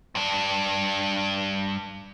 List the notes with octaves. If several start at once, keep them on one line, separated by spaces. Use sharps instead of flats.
G2 D4